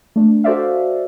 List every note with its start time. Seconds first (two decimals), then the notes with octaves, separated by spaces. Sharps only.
0.16 A3 D4
0.44 F#4 A4 C5 D5 E5 F5